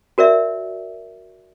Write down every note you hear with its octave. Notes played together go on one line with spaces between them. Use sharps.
F#4 A#4 D5 E5